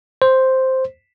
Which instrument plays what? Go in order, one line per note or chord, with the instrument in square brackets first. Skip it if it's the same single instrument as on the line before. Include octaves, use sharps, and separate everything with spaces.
[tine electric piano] C5